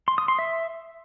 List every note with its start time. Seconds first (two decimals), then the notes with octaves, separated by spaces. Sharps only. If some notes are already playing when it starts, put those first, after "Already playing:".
0.08 C6
0.18 D#6
0.28 C6
0.39 E5